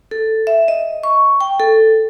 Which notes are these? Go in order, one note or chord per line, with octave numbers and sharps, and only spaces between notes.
A4
E5
D#5
C#6
G5
A4